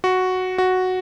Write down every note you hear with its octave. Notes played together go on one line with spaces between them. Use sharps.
F#4
F#4